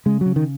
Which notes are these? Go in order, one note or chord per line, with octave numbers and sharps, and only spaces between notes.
C#3 G#3
C#3 F#3
D#3